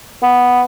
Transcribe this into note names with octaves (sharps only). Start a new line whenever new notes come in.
B3